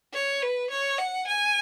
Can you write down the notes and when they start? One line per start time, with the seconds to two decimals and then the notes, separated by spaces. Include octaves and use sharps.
0.13 C#5
0.42 B4
0.70 C#5
0.98 F#5
1.27 G#5